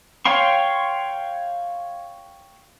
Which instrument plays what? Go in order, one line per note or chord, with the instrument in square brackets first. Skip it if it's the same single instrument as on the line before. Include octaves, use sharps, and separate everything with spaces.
[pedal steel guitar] C#5 F5 G5 C6 C#6